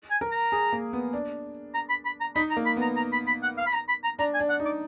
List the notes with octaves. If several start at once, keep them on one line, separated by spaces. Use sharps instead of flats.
G#5
A#4
A#5
G#4
A#3
B3
D4
A#5
B5
B5
A#5
D#4 B5
A#5
A#3
B5
B3 A#5
A#5
B5
B5
F#5
F5
B5
A#5
B5
A#5
D4 A#5
G#5
D4
F#5
D#4
D5